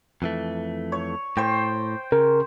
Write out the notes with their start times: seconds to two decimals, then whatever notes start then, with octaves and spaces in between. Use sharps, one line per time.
0.22 F2 E3 A3
0.92 C#5
1.37 A2 C5 G5
2.12 C#3 A#4